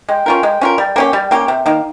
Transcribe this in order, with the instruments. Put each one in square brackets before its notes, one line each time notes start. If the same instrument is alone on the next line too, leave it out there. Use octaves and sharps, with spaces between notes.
[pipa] G#3 [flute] G5
[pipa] C#4 F4 A#4
G#3
C#4 F4 A#4
[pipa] G3 [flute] G5
[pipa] A#3 C#4 G4
G3
A#3 C#4 G4
C3
D#3 A#3